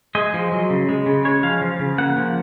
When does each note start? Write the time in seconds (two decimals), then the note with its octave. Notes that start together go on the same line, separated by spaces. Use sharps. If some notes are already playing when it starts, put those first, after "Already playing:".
0.15 G#3 D#5
0.34 F3
0.52 F#3
0.70 C#3
0.89 G#3
1.06 C#3
1.25 G#3 C#5
1.43 F3 F5
1.61 F3
1.79 C#3
1.98 A#3 F#5
2.16 F3